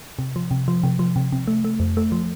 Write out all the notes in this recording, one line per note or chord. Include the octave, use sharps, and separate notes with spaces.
C3
F3
C3
F3
C3
F3
C3
C3
A3
A3
F2
A3
F3